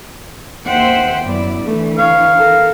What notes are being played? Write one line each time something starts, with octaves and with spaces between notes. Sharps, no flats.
D#2 C5 E5 F#5 G5
F#2 B3 E4 D5
D3 E3 A3
C#5 F5
A4 A#4